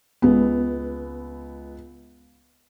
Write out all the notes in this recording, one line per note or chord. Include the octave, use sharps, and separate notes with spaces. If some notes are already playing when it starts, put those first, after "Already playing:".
C#2 B3